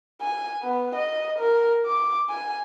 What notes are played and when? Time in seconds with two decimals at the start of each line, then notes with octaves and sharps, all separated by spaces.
0.21 G#5
0.63 B3
0.96 D#5
1.39 A#4
1.86 D6
2.30 G#5